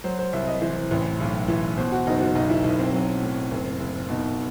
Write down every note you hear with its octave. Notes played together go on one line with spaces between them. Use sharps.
F#3 C5
C5
C2 E5
D#5
E3 C5
A1
B1
E3
B2 C5
F#4
F#1 D#4
F#4
B1 D#4
E4
B1 D#4
C4
F#3
A2
F#1
F#1
B2 D#4